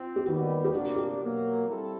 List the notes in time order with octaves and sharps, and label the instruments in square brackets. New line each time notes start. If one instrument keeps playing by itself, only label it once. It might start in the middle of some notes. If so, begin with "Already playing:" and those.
Already playing: [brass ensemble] C4 [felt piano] F4
[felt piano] G4
[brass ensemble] D#2 D#3 G3 B3 [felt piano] F#4
[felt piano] G4
[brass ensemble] D2 C3 F3 A#3 D4 [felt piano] F#4
[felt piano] G4
[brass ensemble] B2 F#3 A#3
G3 C4 E4 A4